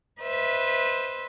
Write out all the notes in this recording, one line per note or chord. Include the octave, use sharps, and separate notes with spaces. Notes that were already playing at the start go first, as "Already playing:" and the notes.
B4 C5 D#5 E5